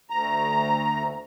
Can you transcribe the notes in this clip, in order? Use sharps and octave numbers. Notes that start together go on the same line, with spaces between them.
D2 A#5